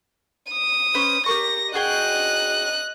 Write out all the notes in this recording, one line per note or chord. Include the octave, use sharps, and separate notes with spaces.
D#6
C#4 B4 C5
G4 A#4 C#6 A#6
F#4 G#4 D#5 G5 F#6